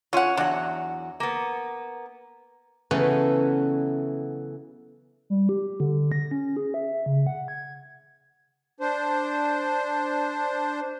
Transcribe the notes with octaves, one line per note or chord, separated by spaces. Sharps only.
C#4 F4 C#5 F#5
E2 F#3 D4 F#5
A#3 B3
C#3 E3 F#3 A3 B3 C#4
G3
G4
D3
A#6
C#4
G#4
E5
C#3
F#5
G#6
D4 C5